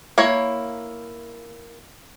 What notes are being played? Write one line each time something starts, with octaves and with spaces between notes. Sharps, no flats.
A#3 E4 C#5